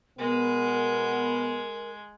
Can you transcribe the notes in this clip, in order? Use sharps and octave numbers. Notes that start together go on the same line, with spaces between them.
B2 G#3 B3 A#4